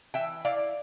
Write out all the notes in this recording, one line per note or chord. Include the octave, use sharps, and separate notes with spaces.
E3 E5 G5
E4 D5 F5